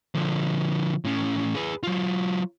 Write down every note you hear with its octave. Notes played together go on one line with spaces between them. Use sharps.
D3 F3
A2 C#4
G#4 B4
F#3 F4